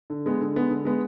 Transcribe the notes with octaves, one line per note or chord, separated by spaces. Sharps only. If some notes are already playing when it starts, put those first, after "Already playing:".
D3
G#3 B3
D3
G#3 B3
D3
G#3 B3